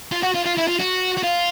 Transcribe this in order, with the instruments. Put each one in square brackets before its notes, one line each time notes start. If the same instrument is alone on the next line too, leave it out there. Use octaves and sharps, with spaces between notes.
[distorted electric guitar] F4
F#4
F4
F4
E4
F4
F#4
F#4
F4